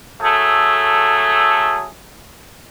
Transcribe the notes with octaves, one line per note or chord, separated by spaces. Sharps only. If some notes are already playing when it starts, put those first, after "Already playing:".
F#3 A3 G#4 A4